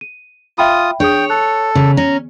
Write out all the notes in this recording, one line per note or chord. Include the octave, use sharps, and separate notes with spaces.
D#7
F4 E5 G5 B5 D#6
D4 G#4 C#5 G5 D#6
A4 F#6
C#3
C#4 A#5